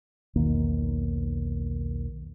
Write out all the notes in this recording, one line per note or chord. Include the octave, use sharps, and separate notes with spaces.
B1 E2 D#3 A#3